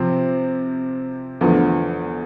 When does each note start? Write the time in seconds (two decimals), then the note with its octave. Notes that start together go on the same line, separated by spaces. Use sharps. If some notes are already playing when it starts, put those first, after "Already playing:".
Already playing: C3 F3 C4
1.41 E2 D3 F3 A3